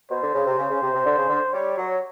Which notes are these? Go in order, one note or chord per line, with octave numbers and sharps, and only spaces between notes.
B2 C5
D3
C#3
C3
C#3
C#3
C3
C3
D3
C#3
D3
G3 C#5
F#3